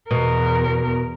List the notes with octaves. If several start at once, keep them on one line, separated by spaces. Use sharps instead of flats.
E2 B2 A#4